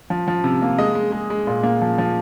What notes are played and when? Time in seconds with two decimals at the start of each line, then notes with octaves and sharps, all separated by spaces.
0.10 F3
0.28 F3
0.44 C3
0.62 A#3
0.78 G#3 D#5
0.95 G#3
1.12 G#3
1.30 G#3
1.47 A#2
1.63 A#3
1.82 F3
1.98 F3